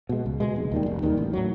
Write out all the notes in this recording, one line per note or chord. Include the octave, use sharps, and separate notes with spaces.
B2 G#3
C#2
B2 G#3
F1
D#2 D#3 G3
F1
D#2 D#3 G3
A1
A2 F#3